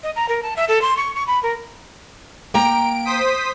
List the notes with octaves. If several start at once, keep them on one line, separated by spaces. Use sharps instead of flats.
D#5
A#5
A#4
A5
E5
A4
C6
C#6
C#6
B5
A#4
A#3 G5 A#5 D7
C5 D#6 B6